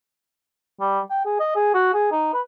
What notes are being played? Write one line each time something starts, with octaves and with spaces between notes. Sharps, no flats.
G3
G5
G#4
D#5
G#4
F#4
G#4
D#4
B4